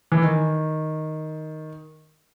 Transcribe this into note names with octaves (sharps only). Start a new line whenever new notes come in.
E3
D#3